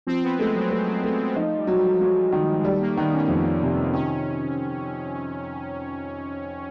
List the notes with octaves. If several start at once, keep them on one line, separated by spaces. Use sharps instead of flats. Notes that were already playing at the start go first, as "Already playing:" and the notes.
F3 C4
B3
G#3 A3
F#3
A3
A3
F3 D#4
G3
F#3
G3
F#3 G#3
D#3
G#3
G3 A3
A#3
D#3 B3
C#4
F2 C#4
C3
D#3 C#4